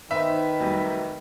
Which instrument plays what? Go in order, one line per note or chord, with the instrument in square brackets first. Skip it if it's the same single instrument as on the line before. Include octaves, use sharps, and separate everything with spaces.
[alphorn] D#3 [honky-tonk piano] B3 D#4 C5 [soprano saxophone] B4 [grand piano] E5
[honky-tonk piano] F1 F#3 G3